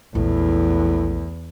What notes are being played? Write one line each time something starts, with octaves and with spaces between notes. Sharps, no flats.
A#1 E2 A2 G#3